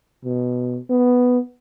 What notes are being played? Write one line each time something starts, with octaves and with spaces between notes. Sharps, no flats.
B2
B3